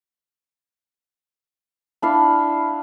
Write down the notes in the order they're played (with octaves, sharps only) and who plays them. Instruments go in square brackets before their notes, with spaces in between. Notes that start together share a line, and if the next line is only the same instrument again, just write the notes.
[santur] D4 E4 F5